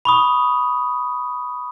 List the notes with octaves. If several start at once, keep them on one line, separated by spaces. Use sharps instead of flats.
B5 C#6 D#6